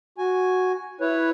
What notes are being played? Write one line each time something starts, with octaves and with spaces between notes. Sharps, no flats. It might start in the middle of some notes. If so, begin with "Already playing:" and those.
F#4 G#5
E4 B4 C#5